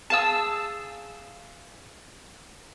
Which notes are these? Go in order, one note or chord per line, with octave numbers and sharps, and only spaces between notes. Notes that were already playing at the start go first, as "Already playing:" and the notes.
G#4 F5 A5 D#6 E6